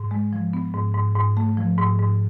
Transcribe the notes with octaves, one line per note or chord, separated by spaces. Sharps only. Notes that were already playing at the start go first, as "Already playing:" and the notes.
Already playing: G#2
G#3
F3
B3
G#2
G#2
G#2
A3
F3
G#2
G#2